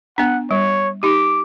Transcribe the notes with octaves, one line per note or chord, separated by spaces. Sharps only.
B3 D4 F#5
G3 C#5
D#4 G4 D6